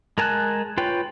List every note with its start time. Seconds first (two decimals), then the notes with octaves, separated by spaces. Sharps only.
0.18 G#3 A#4 G#5 A5 F#6
0.77 F4 B4 C#5 G5